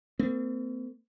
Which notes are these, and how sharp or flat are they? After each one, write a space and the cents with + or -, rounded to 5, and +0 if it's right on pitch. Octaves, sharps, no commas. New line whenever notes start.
A3 +45 C4 -40